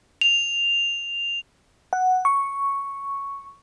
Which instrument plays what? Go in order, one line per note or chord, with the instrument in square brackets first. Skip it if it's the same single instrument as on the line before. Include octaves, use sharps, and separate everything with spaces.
[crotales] F7
[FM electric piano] F#5
C#6